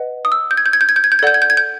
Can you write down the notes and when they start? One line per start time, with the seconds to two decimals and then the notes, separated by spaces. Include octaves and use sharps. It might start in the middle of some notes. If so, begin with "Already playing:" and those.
Already playing: B4 D#5 F#5
0.25 D#6
0.32 E6
0.51 G6
0.57 G#6
0.66 G6
0.73 G#6
0.81 G6
0.89 G#6
0.96 G6
1.04 G#6
1.12 G6
1.19 G#6
1.23 A4 D5 F#5 G6
1.34 G#6
1.42 G6
1.50 G#6
1.57 G6